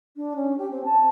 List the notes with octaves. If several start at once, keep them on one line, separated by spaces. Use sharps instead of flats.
D4
C#4
G4
C4
A5